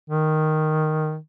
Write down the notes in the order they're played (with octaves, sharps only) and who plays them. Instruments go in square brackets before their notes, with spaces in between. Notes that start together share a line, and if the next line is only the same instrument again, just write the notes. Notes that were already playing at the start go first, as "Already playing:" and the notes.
[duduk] D#3